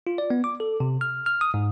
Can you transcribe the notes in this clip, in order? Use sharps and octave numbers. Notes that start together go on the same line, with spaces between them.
F4
D5
B3
D6
A4
C3
F6
F6
D#6
G#2